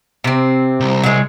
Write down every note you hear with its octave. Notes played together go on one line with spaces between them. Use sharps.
C3 C4
C2
F#3 G#3